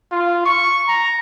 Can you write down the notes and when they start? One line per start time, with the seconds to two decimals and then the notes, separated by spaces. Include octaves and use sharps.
0.11 F4
0.45 C#6
0.88 A#5